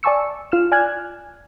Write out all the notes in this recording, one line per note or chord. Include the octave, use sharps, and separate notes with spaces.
D5 G#5 A5 C#6 E6 C#7
F4 F6 E7
D5 G#5 F6 F#6 G#6